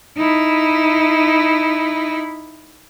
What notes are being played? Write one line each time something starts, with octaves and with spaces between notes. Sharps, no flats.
D#4 E4